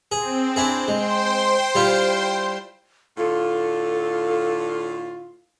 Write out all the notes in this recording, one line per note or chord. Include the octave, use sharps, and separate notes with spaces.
C4 G#4
D4 E4 G#4
G#3 C5 G5 C6
G3 E4 F4
A2 D3 F4 A4